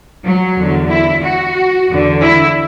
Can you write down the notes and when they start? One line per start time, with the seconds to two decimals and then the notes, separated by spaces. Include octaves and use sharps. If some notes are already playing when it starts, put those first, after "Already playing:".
0.25 F#3
0.57 E2 D3
0.90 E4
1.23 F#4
1.88 E2 D3
2.21 E4